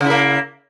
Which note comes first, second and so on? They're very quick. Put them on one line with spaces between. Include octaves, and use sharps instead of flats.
C#3 E4 A#3